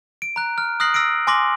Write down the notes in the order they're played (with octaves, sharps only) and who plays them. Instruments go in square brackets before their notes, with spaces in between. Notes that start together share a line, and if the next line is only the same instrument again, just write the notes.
[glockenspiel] D7
A#5 F#6
F6
D#6 F6 F#6 A#6 C7 F#7
E6 A#6 C7 D7
G#5 C6 D6 A#6 F#7